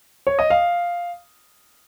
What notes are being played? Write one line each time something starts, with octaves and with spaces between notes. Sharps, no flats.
C#5
D#5
F5